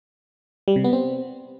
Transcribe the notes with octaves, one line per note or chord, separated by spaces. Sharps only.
G3
C3
B3
C4